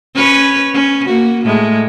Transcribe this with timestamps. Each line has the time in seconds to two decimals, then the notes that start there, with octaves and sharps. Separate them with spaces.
0.15 C#4 B4 C#5
0.73 C#4
1.05 A#3 F#4
1.44 A2 G#3